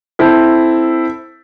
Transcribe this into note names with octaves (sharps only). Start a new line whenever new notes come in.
C4 E4 A4